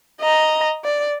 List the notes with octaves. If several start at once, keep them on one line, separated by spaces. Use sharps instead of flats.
D#5 A#5
D5